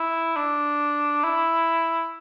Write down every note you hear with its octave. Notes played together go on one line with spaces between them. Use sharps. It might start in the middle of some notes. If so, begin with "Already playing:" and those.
Already playing: E4
D4
E4